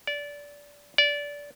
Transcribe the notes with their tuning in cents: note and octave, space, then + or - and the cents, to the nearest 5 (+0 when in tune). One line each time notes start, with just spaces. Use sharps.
D5 -20
D5 -20